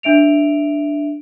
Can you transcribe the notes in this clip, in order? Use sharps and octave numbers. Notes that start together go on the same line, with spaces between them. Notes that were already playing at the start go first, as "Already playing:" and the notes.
D4 E5 D7 F7